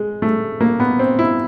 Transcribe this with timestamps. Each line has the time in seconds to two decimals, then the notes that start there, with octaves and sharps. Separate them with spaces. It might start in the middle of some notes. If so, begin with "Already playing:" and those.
Already playing: G#3
0.22 A3
0.61 A#3
0.80 B3
0.99 C4
1.19 E4